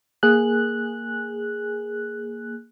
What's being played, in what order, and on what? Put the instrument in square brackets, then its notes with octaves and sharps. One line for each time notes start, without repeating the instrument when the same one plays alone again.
[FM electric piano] A#3 G#4 F#6